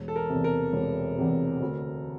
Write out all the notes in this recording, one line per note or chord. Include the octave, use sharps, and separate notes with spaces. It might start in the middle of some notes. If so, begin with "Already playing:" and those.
Already playing: E1
A4
A#4
E2 C3
A#4
E1
E2 C3
D2